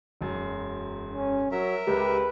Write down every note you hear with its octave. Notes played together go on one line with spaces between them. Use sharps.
E1 F#2
C#4
F#3 A#4 E5
C#2 G4 B4